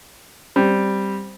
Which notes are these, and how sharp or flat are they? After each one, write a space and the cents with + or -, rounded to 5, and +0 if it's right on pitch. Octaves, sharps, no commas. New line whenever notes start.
G3 +0 C4 +0